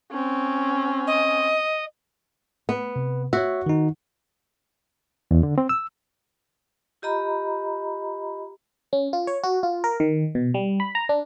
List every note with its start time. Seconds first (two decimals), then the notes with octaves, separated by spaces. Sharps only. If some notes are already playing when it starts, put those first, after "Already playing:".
0.11 C4 C#4
1.07 D#5
2.69 B3
2.96 C3
3.33 F#4 C#5 E5
3.66 D#3 D#4
5.31 E2
5.43 D3
5.58 C4
5.69 E6
7.02 F4 G4 D#5 A#5 B5
8.93 C#4
9.13 F4
9.27 C#5
9.44 F#4
9.63 F4
9.84 A#4
10.00 D#3
10.35 B2
10.54 G3
10.80 B5
10.95 A#5
11.09 D4